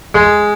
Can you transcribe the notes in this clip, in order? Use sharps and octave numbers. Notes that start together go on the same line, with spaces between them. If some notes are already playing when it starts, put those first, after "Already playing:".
G#3